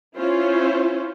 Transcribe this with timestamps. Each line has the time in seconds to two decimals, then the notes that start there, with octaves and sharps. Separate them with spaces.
0.16 C#4 E4 F4 C5